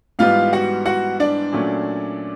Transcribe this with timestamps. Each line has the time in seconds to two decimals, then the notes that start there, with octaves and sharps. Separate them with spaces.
0.19 G#2 E3 G3 B3 F4 F5
0.53 F#4 F#5
0.86 F#4 F#5
1.20 D4 D5
1.52 A#2 F#3 A3 C#4